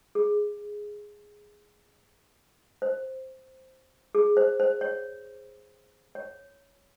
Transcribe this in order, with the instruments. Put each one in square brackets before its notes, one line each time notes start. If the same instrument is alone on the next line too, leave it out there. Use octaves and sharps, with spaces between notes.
[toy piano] G#4
C5
G#4
C5
C5
C#5
C#5